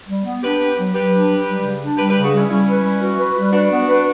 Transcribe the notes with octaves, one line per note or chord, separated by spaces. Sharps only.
G3
B3
D4 G4 B4
B3
F#3
F#3 G4 B4
D4
F#3
G3
C#3
D4
G3 G4 B4
C#3 G4 B4
D4 F#4
G3 C#4 E4
G3 C#4 E4
B4
G3
F#4
B4
G3
D4 F#4 B4
B3
B4